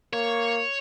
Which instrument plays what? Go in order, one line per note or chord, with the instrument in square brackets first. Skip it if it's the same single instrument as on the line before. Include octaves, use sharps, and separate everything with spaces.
[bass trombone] A#3 [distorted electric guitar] C#5